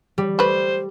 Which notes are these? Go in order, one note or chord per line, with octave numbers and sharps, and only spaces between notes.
G3
A3 B4 C5